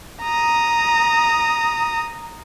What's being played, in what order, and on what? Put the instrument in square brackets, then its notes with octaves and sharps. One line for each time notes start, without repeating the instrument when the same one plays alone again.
[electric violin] A#5 D#6